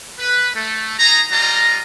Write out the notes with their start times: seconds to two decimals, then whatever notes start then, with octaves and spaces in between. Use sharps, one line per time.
0.19 B4
0.54 A3
0.98 D#4 G#4 A#5
1.31 G3 F4 D#5 A#5